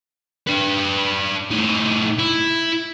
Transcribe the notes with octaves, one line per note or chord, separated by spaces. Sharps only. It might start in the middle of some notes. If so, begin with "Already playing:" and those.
D4 B4
A2 D#4
E4